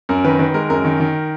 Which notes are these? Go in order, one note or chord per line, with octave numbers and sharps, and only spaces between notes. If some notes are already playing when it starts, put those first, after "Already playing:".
F#2 A#4
D#3 B4
D#3 B4
G#3 A#4
F#2 A#4
D#3
D#3